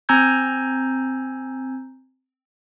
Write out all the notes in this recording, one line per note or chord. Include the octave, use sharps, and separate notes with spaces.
C4 G#5 A#5 E6 G6 G#6